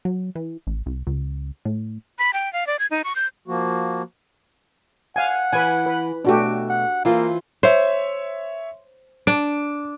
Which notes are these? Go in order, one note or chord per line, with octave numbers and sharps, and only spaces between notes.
F#3
E3
A1
C2
C#2
A2
B5
G5
F5
D5
G#6
D#4
C#6
G6
F3 A#3 F#4
F5 F#5 G#5
E3 B4 G#5
B4
B2 A3 D4 F#4 G4
F#5
E3 A#3 C4 F4
C5 C#5 E5
D4 D7